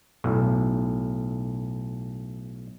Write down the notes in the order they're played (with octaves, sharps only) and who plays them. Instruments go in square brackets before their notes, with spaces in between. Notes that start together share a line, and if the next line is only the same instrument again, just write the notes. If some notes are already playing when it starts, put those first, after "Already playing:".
[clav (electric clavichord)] B1 A2